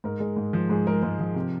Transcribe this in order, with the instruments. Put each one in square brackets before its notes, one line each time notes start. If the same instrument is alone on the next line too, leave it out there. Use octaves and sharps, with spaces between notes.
[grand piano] G#2 A#4
G#3
G#2
F3
G#2 G#4
G#3 A#4
G#2 A#4
F3
C3